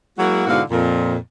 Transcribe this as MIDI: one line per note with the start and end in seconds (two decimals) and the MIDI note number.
0.17 0.47 54
0.17 0.47 56
0.17 0.47 58
0.17 0.47 64
0.17 0.47 66
0.47 0.61 44
0.47 0.61 47
0.47 0.61 50
0.47 0.61 64
0.47 0.61 66
0.47 0.61 77
0.70 1.16 41
0.70 1.16 46